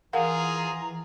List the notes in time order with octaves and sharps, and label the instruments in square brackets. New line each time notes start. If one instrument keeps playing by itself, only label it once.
[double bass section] E3 [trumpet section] F4 G#4 [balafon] A#4 F5 F#5 [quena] A#5